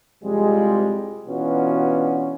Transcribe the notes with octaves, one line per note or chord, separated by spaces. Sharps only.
C2 F2 F3 G3 G#3
B2 E3 C#4 D4 F4 F#4